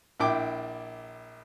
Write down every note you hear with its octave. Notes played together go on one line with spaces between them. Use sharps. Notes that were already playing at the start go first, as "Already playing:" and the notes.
A#1 E4 G5 D6